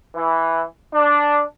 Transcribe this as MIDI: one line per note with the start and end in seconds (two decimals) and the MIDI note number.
0.14 0.63 52
0.94 1.42 62